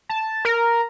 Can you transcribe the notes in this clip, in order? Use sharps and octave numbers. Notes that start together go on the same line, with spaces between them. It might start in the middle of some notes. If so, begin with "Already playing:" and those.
A5
A#4